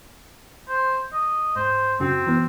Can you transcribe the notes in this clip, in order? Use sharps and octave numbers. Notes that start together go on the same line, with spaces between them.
C5
D#5
G#2 C5
F#2 C#3 C4 F#4
E3 B3